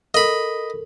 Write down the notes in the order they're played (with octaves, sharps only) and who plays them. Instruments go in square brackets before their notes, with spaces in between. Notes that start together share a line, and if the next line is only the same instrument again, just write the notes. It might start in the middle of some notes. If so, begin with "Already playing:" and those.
[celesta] A4 A#4 [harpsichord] D#5 B5